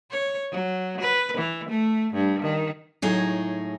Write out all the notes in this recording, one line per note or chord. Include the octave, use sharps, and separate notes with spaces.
C#5
F#3
B4
E3
A3
G2
D#3
A2 F#3 D#4 G#4